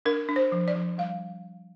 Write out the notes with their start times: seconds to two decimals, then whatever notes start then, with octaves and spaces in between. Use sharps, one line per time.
0.05 D4 A#4
0.29 D4
0.36 C5
0.52 F3
0.68 D5
0.75 F3
0.98 G3 F5